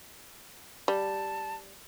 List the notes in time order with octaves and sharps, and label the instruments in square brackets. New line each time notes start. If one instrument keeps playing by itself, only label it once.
[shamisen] G3 [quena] A5